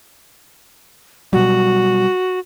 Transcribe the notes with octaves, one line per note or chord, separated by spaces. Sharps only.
B2 F#3 G3 F#4